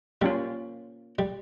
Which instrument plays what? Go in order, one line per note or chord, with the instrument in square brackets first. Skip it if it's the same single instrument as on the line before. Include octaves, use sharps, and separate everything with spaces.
[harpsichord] G3 [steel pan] A#3 C#4 F4
[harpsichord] G3